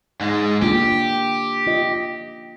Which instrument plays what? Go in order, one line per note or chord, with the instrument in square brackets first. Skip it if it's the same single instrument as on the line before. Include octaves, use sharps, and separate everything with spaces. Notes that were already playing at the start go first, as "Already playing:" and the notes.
[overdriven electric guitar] G#2 G#3
[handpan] A#3 D4 F4 [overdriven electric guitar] G4
[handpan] F4 D#5